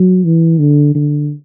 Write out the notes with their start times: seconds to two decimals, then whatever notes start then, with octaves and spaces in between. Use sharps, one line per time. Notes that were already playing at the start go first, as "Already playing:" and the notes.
Already playing: F#3
0.24 E3
0.60 D3
0.95 D3